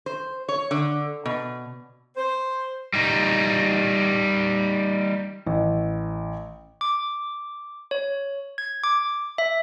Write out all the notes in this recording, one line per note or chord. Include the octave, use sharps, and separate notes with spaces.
C5
C#5
D3
B2
C5
G3 D#4
A1
D6
C#5
G#6
D6
E5